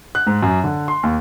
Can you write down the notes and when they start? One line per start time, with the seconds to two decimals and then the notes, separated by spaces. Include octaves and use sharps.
0.15 F#6
0.27 G#2
0.43 F#2
0.64 D3
0.88 C6
1.03 D#2